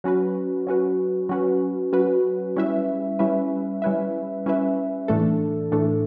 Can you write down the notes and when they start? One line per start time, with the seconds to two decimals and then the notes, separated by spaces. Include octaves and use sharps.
0.04 F#3 C#4 F#4 B4
0.67 F#3 C#4 F#4 B4
1.29 F#3 C#4 F#4 B4
1.93 F#3 C#4 F#4 B4
2.56 G3 C#4 E4 B4 E5
3.19 G3 C#4 E4 B4 E5
3.82 G3 C#4 E4 B4 E5
4.46 G3 C#4 E4 B4 E5
5.08 A2 E3 A3 D4 A4
5.72 A2 E3 A3 D4 A4